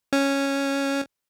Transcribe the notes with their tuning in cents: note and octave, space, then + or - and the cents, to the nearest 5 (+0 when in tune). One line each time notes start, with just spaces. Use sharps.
C#4 -5